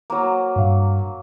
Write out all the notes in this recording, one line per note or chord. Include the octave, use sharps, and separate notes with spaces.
F#3 A#3
G2 F5